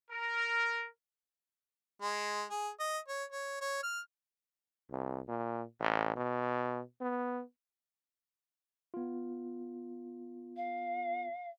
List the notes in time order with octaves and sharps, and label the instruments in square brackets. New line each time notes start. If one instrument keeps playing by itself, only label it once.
[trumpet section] A#4
[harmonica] G#3
G#4
D#5
C#5
C#5
C#5
F6
[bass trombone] C2
A#2
A1
B2
B3
[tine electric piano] B3 F4
[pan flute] F5